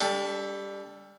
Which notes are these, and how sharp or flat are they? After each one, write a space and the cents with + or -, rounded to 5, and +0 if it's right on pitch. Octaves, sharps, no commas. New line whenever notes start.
G3 +20 D4 -40 A4 +0